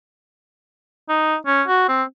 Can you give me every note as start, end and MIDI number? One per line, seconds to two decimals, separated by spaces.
1.09 1.36 63
1.46 1.62 61
1.68 1.87 66
1.88 2.03 60